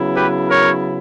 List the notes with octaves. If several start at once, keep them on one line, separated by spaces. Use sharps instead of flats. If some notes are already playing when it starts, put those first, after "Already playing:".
Already playing: C#3 F#3 B3 E4
G4 B4
A#4 C#5